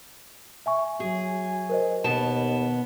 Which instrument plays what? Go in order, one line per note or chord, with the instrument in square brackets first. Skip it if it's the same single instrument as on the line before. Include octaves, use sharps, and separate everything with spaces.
[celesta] E5 G#5 C#6
[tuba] F#3 [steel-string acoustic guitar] G#4
[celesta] A#4 C5 D#5
[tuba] D#2 [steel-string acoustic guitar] B2 B3 A5